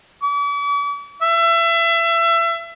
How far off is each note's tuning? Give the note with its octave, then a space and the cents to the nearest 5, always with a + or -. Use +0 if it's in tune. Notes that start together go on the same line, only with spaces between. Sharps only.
D6 -45
E5 +30